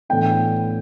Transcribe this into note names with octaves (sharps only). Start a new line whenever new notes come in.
A2 E3 B3 D4 G5